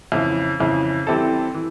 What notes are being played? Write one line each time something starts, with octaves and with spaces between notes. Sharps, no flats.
F2 C#3 E3
F2 C#3 E3
E3 G3 C4 E4 A4
E3